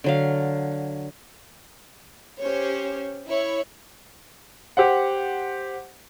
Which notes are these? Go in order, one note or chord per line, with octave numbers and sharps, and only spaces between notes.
D3 F#3 F5
C#4 G4 C5 C#5
E4 C#5
G4 C5 F#5